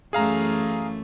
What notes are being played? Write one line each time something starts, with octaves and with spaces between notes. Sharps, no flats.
F#2 E3 A3 G#4 F5 A#5